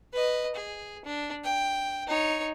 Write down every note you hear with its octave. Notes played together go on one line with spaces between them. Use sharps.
B4 D#5
G#4
D4
G5
D#4 C#5